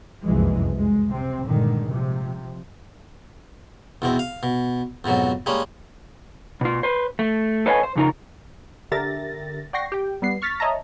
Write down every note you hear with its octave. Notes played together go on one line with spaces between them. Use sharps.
F#1 C2 F2 E3 G#3
G#3
C3 C4
G2 A#2 D3 D#3 G#3
C3 F3
E2 B2 C4
F5
B2
F2 G#2 B2 F#3
G3 G#3 A#3 C#4
B2 F4
B4 C5
A3
A4 B4 C#5 D#5 F5 G#5
C5
F2 C#3 D#4 F4 A#4
D3 G4 A#4 E5 A6 A#6
D5 F#5 G5 C#6 A#6 C7
G4 G5
G3 B3 C7
C#6 F6 A6 B6
C#5 D#5 E5 A5 A#5